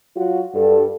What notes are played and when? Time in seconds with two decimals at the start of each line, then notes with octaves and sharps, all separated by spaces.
0.16 F#3 F4 F#4
0.54 G2 A4